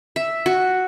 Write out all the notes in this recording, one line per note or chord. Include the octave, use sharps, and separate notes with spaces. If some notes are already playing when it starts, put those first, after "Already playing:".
E5
F#4